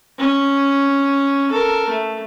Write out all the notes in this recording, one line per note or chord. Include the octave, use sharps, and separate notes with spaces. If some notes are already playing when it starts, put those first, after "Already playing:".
C#4
A4 A#4
A3